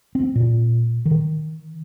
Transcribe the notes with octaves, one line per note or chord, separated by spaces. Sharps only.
C4
A#2
D#3